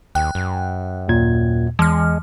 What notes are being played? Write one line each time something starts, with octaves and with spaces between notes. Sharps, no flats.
D#2 G5 F#6
F#2
D#2 A#2 G#6
E2 E3 G#3 F6